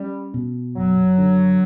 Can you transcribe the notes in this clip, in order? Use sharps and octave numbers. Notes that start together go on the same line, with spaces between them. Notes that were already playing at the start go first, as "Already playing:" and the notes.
Already playing: G3 C#4
B2
F#1 F#3
D3